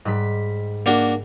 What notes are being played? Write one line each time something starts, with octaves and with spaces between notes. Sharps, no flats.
G#2 G3 B6
A#3 D4 F#4